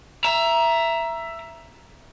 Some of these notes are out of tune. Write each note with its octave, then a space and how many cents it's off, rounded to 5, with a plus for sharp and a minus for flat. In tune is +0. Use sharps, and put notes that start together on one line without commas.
E5 +15 A#5 +15